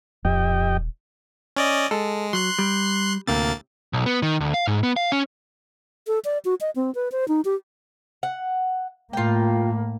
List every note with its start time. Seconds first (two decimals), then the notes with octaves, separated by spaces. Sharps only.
0.25 D#1 F2 G4 D#5 G5
1.57 C#4 D5 D#5
1.91 G#3 A4
2.33 F#3 C6 F#6 C7
2.59 G3
3.27 D2 A2 C3 A#3 A6
3.93 B1
4.06 B3
4.22 D#3
4.40 D2
4.54 F5
4.67 G#2
4.83 B3
4.96 F5
5.12 C#4
6.07 A4
6.25 D5
6.45 F#4
6.61 D#5
6.76 C4
6.95 B4
7.12 C5
7.28 D#4
7.45 G4
8.23 F#5
9.13 A2 A#3 F4 G5